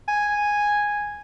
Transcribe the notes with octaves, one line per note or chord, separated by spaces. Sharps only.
G#5